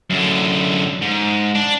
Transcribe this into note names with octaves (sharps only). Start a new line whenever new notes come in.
F#2 D3
G#2
D4